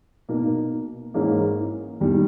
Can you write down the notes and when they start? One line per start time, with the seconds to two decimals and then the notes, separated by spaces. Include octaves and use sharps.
0.29 B2 A#3 D#4 A#4
1.14 G#2 E3 A#3 C#4 G#4
2.00 E2 D#3 G3